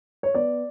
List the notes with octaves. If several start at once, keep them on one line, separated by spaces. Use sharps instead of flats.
C#5
B3 D5